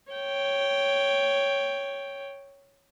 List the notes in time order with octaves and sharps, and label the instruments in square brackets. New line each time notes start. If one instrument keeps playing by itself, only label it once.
[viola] C#5 G5